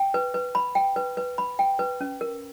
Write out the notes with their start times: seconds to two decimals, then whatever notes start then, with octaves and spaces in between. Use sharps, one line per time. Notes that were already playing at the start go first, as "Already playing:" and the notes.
Already playing: G5
0.14 B4
0.34 B4
0.55 B5
0.75 G5
0.96 B4
1.17 B4
1.38 B5
1.59 G5
1.79 B4
2.01 C#4
2.21 A#4